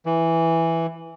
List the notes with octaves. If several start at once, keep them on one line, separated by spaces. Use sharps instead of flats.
E3